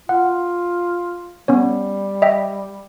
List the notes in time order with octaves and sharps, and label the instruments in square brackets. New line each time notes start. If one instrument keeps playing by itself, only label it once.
[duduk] F4 [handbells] F#5
[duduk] G3 [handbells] B3 C#4 C#5
[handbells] D#5 E5 G5